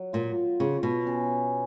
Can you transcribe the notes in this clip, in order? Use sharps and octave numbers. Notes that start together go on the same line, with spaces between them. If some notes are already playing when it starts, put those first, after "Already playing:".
Already playing: F#3
A#2 F4
C#3 F4
B2
C#4